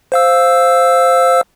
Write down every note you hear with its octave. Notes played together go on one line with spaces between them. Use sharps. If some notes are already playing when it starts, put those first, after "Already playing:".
C5 F5 E6